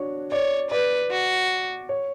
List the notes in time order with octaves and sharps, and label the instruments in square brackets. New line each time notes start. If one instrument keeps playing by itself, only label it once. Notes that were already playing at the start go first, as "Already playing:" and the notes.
Already playing: [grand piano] D4 F#4 C#5
[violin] C#5 [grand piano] D5
[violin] B4 [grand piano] D5
[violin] F#4
[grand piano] C#5